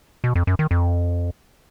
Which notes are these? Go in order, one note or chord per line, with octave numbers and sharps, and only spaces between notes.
B2
F2
F#2
D#3
F2